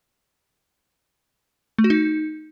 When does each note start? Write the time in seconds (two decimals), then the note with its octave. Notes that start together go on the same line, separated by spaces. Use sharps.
1.78 A3
1.84 F#4
1.90 D#4